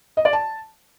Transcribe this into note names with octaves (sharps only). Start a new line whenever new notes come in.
D#5
D5
A5